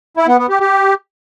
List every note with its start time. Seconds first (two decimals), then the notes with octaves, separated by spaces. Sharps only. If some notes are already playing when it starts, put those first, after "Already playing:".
0.17 E4
0.28 B3
0.38 B3
0.49 G4
0.60 G4